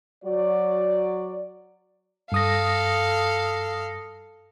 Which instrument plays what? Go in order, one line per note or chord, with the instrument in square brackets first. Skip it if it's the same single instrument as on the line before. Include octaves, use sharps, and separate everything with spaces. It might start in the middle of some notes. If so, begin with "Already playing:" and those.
[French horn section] F#3 F#4 D5
[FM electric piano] G2 D#6 A#6 [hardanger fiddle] A4 F5